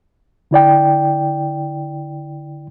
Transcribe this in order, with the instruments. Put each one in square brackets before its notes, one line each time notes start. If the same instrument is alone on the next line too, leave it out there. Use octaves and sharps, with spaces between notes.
[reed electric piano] D3 E4 D5 G5